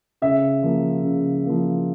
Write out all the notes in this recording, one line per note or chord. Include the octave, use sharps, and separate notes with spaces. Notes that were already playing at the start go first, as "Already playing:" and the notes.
C#3 E5
F3 A#3
C#3
F3 A#3